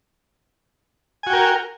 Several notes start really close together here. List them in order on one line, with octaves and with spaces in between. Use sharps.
G#5 F#4 G5 A#4